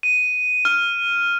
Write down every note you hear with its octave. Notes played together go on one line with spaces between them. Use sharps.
D#7
F6